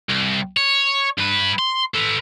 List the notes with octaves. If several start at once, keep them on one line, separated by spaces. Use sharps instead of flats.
C2
C#5
G2 B4
C6
A4 B4